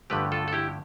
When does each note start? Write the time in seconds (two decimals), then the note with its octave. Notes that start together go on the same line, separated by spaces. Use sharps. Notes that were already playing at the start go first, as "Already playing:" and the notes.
0.10 G2 D3 F3 A3 G4 B4
0.32 F4 A4
0.48 A4
0.53 E4 G4